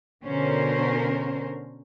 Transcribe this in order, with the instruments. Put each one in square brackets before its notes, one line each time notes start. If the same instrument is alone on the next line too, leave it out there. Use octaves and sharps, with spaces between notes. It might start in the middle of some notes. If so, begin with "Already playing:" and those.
[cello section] B2 D3 C#4 A#4 C5